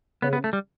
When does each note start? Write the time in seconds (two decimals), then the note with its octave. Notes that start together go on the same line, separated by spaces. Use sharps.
0.22 C#3 B3
0.33 B3
0.44 A3
0.53 G3